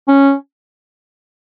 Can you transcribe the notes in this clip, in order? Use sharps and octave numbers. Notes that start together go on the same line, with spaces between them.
C#4